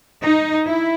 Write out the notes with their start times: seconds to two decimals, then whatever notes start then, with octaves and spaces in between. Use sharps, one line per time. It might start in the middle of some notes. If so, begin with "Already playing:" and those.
0.24 D#4
0.66 E4